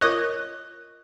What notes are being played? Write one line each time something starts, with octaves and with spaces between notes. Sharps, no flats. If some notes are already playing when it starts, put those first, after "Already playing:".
F4 A#4 C#5 D#5 C#6 D#6 F#6